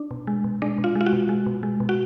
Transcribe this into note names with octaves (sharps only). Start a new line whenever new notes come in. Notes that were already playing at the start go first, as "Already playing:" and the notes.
Already playing: D4
B2
G#3
B2
G#3 D4
B2
F4
G#3
F4
F#4
B2
G#3
B2
G#3
B2
F#4